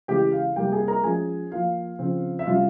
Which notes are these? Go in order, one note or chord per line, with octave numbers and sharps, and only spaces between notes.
C#3 E3 G#3 G4 G5
F5
C3 G3 A#3 G4 G5
G#4 G#5
A#4 A#5
F3 G#3 C#4 G#4 G#5
F3 A#3 F4 F5
C#3 F3 C4 F4
E5
C3 G3 C#4 F4 F5